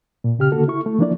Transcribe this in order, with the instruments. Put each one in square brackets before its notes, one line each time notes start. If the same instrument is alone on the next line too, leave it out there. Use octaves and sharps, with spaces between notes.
[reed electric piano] A#2
C#3 G4 F6
D3 A#3 F#4 A4
E4 C#6
A3
E3 F3 A#3 D4 E4 D5